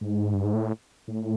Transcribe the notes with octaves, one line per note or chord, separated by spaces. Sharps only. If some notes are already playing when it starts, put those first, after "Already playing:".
G#2
G2
G#2
A2
A2